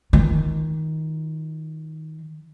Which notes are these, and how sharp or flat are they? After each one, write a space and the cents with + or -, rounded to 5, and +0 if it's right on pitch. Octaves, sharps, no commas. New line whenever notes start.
D#3 +15 F4 -15